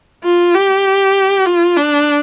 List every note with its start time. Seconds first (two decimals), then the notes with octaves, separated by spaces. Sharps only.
0.24 F4
0.55 G4
1.46 F4
1.77 D4